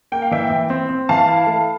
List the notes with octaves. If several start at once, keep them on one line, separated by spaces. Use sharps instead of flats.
A#3 G5
F5
E3 E5 G5
E3
C4
C4
E3 F5 A5
E4
A3